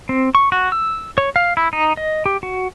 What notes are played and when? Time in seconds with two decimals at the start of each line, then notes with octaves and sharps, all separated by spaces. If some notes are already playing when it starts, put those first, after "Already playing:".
0.09 C4
0.35 C#6
0.52 F#4
0.72 E6
1.18 C#5
1.36 F5
1.57 E4
1.73 D#4
1.97 D#5
2.26 G4
2.43 F#4